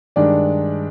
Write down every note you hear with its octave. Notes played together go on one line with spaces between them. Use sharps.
G2 D#3 G#3 D4 D5